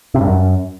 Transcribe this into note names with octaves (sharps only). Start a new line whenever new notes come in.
C3
G2
F#2